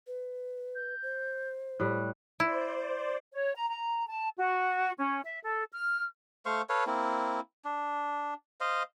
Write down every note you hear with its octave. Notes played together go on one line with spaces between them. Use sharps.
B4
G6
C5
A2 G3 F#6
E4 C5 D5
C#5
A#5
A#5
A5
F#4
C#4
E5
A4
F6
A3 C5 F5 C#6
A4 B4 C#5 F5
A#3 C4 E4
D4
C5 D#5 F5